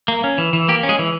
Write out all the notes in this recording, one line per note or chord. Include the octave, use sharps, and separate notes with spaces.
A#3
C#4
E3
E3
A#3 G4
C#4
G#3 G#4
E3